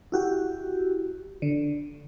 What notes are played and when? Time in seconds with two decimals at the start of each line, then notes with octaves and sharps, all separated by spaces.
0.12 E4 F#4 G4
1.42 D3